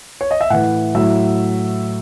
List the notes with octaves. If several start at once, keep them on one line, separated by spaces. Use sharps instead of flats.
C#5
D#5
E5
A2 E3 F#5
A2 F#3 E5